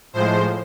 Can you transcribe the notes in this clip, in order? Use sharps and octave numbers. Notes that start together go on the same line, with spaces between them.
A2 F3 G#3 C5